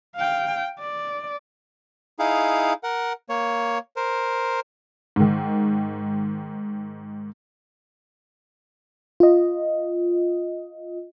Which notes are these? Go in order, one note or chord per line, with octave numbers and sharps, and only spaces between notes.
F5 G5
D5
D#4 E4 G#4 F5
A#4 F#5
A#3 C#5
A#4 C5
G#2 D#3
F4 D#5